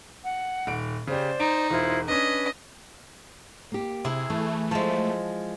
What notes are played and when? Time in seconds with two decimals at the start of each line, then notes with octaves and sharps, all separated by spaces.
0.24 F#5
0.67 D#1 D7
1.07 C#3 G4 C5 D5
1.40 D#4 D7
1.70 E1 E4 F4 C5
2.08 C#4 D4 B4 D#5
3.72 A#3 G4
4.05 C3 E4 G#4
4.30 E3 A3
4.71 F3 G#3 A5